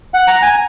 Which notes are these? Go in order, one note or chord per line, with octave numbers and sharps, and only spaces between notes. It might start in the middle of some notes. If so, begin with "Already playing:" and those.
F#5
A#5
G#5